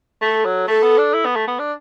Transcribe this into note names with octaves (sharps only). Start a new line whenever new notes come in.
A3 A4
F#3
A3 A4
B3
D4
E4
B3
A3
B3
D4